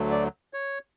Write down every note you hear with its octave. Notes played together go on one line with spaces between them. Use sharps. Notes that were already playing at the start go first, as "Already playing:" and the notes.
Already playing: D2 D3 F#3 A3
D5
C#5